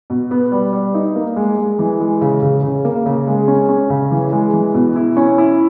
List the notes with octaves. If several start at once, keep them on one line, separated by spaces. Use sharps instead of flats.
B2
B3
G3
G3
D#4
A#3
G#3
G#3
E3
G#3
C#3
C#3
C#3
A#3
C#3
G#3
C#4
C#4
C#3
E3
G#3
E3
B2
E4
C#4
E4